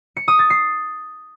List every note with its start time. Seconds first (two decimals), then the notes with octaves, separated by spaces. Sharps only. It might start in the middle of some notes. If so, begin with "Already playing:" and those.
0.17 C#7
0.28 D#6
0.39 A6
0.50 C7